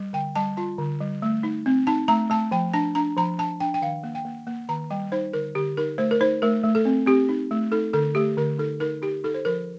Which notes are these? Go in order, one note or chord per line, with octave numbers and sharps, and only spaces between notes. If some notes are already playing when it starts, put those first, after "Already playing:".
Already playing: G3
D3 G5
G3 A5
F4 A5
D3
G3
A3
D#4
C4
D#4 A5
A3 A#5
A3 A5
F3 G5
D4 A5
D4 A#5
F3 A#5
D4 A5
D4 G5
G5
D#3 F5
A#3
G5
A#3
A#3
D#3 A#5
G3 G5
D#4 C5
D3 A#4
D3 G4
D#4 A#4
A3 C5
A#4
D#4 C5
A3 A#4
A3
A4
C4
C4 G4
D#4
A3
D#4 A4
D3 A4
A3 G4
D3 A#4
D#4 A4
D#4 A#4
D#4 G4
D#4 A4
C5
F3 A#4